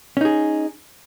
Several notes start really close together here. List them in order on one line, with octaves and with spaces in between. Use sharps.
C#4 D#4 G#4